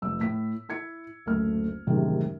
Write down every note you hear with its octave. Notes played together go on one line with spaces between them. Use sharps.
F1 E6
A2 B6
E4 G#6 C#7
F#1 D2 A3 F6
A1 F#2 A2 C3 D#3 G#3